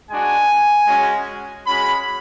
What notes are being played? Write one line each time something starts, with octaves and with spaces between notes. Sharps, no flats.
G#3 D4 F#4 G#5
G#3 C#4 F#4
G#3 C#4 F#4 B5